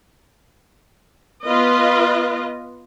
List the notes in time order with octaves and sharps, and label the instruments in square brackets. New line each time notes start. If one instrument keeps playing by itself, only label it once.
[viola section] B3 F4 B4 D#5